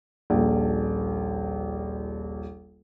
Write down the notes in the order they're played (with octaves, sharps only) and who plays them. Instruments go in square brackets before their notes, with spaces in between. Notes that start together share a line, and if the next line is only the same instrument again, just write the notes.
[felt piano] D#1 A#1